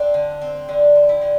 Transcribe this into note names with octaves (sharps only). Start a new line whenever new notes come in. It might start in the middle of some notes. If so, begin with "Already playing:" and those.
Already playing: C4 D4
D3
C4
D3 D4
C4
E4
D3